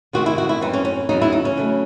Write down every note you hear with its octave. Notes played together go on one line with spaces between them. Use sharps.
C3 D#3 G#3 C4 F#4
E4
F#4
E4
F#2 E3 C4 D#4
C#4
C#4
E2 C#3 F#3 D#4
E4
D#4
C#4
C#3 F#3 A3